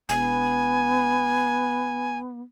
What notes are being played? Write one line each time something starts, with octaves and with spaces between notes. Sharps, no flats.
E1 B3 G#5